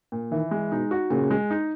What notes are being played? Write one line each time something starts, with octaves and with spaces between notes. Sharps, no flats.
A#2
D#3 E3
G#3
B2 D#4
F#4
A#2 C#3
G#3
D#4